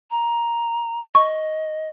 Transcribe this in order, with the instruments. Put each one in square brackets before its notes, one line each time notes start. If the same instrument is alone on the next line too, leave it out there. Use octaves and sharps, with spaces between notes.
[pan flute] A#5
[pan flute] D#5 [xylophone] C#6